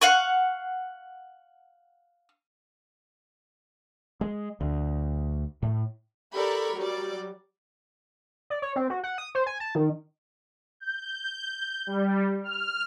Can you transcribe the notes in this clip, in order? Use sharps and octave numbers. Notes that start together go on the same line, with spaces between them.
F5 F#5 C#6
G#3
D2
A2
G4 A4 A#4 D5 B5 C#6
F#3 G3 D5
D5
C#5
C4
F#4
F#5
D#6
C5
G#5
A5
D#3
G6
G3
F6